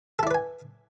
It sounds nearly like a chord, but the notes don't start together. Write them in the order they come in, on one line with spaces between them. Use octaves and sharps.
A4 E4 D5 B4 G#5